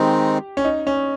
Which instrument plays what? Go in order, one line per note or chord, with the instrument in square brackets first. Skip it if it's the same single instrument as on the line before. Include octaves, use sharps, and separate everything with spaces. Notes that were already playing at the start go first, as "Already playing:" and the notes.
Already playing: [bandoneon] D#3 G#3 C4 D#4 [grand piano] G4
[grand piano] C#4
D#4
C#4